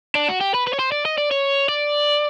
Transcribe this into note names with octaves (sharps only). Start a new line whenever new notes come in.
D4
F#4
G4
B4
B4
C#5
C5
D5
D#5
D5
C#5
D5